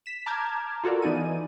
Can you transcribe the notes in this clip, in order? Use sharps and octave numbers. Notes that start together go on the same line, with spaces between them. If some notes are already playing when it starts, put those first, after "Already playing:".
B6 E7
A5 A#5 D6 F6 G6 G#6
F4 F#4 A4 A#4 D5
E3 B3 D#4 D5 G#5 D#7